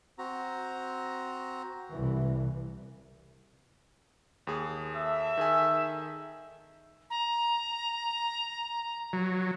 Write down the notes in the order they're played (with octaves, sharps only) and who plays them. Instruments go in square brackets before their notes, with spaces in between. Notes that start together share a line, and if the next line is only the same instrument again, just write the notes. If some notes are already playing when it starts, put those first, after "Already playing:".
[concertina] C4 F#4 A#5
[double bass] C2 E3
[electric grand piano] D#2 G#4
[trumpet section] A4 E5
[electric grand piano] D#3 G#4 G#5
[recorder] A#5
[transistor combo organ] F#3